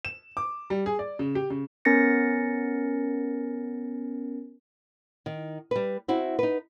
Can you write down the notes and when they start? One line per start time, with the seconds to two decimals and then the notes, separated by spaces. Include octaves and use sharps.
0.05 E7
0.37 D6
0.70 G3
0.86 G#4
0.99 D5
1.19 C#3
1.35 G4
1.50 C#3
1.85 B3 C#4 A#4 A6 A#6 C#7
5.26 D#3
5.71 G3 B4
6.08 C4 E4 F#4
6.39 D#4 B4